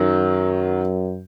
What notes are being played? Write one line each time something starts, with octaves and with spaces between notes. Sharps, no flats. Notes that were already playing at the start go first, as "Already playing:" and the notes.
Already playing: F#2 D#3 F#3